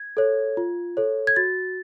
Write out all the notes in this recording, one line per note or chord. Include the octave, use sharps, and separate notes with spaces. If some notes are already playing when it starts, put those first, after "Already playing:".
Already playing: G#6
A4 C#5
F4
A4 C#5
G#6
F#4 A6